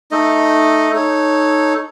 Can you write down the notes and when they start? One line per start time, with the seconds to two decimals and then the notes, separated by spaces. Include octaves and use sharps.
0.11 A3 D#4 A4 D#5
0.93 D#4 A4 C#5